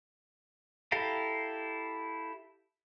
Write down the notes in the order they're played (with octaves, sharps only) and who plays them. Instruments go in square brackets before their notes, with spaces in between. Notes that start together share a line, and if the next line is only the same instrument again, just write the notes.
[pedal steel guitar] E4 G4 A4 F5 A#5